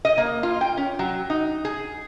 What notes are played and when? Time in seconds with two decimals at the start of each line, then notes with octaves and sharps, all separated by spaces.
0.05 D#5
0.18 A#3
0.43 F4
0.61 G5
0.77 C#4
0.99 F#3
1.30 D#4
1.65 G#4